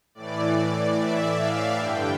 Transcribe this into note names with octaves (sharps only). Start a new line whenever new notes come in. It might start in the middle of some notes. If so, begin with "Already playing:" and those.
A2 E3 D5
E5
F5
G2 D3 G5